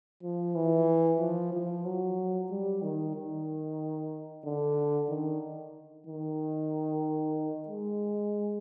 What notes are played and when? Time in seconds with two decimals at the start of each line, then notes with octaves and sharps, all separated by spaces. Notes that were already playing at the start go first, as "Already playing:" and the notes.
0.23 F3
0.55 E3
1.20 F3
1.53 F3
1.85 F#3
2.50 G3
2.83 D#3
3.15 D#3
4.44 D3
5.09 D#3
6.07 D#3
7.68 G#3